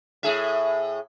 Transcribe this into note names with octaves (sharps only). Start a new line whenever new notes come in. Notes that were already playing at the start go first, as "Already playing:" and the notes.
A2 G#4 E5